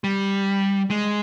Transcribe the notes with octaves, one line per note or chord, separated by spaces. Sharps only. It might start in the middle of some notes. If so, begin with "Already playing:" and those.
G3
G#3